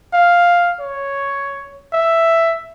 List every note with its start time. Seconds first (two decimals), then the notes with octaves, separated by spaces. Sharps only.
0.14 F5
0.80 C#5
1.93 E5